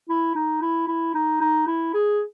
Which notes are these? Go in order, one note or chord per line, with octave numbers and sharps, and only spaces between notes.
E4
D#4
E4
E4
D#4
D#4
E4
G#4